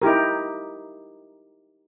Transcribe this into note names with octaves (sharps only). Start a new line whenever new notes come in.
D#4 E4 G4 A#4